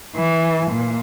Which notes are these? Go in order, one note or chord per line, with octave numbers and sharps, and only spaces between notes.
E3
A#2